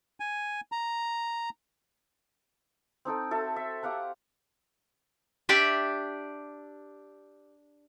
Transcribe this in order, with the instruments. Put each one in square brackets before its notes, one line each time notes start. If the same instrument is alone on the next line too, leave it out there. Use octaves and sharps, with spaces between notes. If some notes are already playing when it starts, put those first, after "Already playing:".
[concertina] G#5
A#5
[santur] C4 D#4 A4 G5
F#4 A4 E5
E5
G4 F5 F#5 A#5
[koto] D4 G4 D5 E5